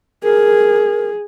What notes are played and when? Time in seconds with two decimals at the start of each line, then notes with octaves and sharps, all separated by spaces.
0.23 G#4 A#4